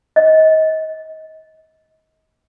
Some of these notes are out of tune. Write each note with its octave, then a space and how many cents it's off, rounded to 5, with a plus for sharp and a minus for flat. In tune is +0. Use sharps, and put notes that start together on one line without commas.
D#5 +30